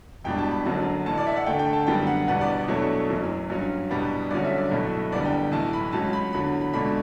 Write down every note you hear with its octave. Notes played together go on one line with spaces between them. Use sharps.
E1 E2 B2 G3 D4 G5
A5
B5
F#1 F#2 D3 F#3 A5
A1 A2 E3 A5
D5
E5
F#5
D2 D3 A3 G5
G5
A5
F#2 D3 G3 B3 G5
F#5
E2 B2 G3 B3 D4 F#5
D5
D5
E2 B2 F#3 A3 D4 C#5
F#1 F#2 E3
G2 F#3 C#4
E2 B2 G3 B3 D4
G1 G2 D3 F#3 C#4 D5
E5
D5
B1 B2 A3 E4
F#1 E2 D3 G3 B3 D5
G5
B1 A2 E3 A5
B5
C#2 C#3 F#3 A5
B5
E2 D3 F#3 B5
B5
C#2 B2 A3 D4 B5